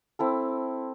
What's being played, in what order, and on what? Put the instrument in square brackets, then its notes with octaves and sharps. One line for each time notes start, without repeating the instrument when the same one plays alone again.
[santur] C4 E4 A4